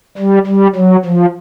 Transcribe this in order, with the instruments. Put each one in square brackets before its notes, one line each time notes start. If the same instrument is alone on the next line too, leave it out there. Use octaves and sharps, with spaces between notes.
[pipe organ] G3
G3
F#3
F3